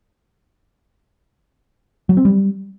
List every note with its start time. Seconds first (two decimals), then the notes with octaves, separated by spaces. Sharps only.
2.09 F#3
2.17 C4
2.25 G3